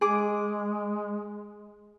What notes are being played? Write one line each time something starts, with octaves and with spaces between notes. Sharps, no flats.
G#3 G#4 D6